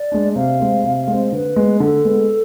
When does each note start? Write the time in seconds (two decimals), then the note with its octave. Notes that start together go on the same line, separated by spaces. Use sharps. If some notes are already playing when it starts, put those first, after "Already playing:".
Already playing: D5
0.12 G#3 D4
0.36 C3 F5
0.60 G#3 C4
0.84 C3
1.07 G#3 C4
1.32 D3 B4
1.56 G#3 B3
1.80 D3 A4
2.05 G#3 B3